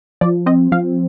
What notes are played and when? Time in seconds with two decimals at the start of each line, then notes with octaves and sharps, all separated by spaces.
0.21 F3 D5
0.46 C4 D#5
0.72 F3 F5